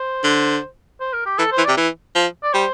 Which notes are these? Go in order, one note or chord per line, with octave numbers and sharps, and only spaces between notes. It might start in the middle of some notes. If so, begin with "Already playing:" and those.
Already playing: C5
D3
C5
A#4
G4
E3 A4
C5
E3
D5
C3
E3
F3
D5
G3 C5